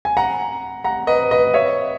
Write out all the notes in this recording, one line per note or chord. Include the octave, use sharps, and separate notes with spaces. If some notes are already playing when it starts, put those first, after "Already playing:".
G#5
F#5 A#5
F#5 A#5
B4 D#5
B4 D#5
C#5 E5